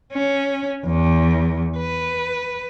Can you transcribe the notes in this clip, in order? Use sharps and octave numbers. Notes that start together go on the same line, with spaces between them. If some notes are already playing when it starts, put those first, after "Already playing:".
C#4
E2
B4